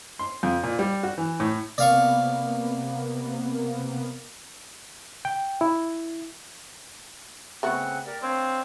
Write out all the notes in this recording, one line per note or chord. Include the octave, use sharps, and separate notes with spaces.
C6
F2
A#2
G3
F#4
E3
A2
C3 A#3 B3 D5 F5 C#6
G5
E4
C#3 A3 B3 C4 F#4 F#5
G4 A#4 D5
C4 D4 C#5 F5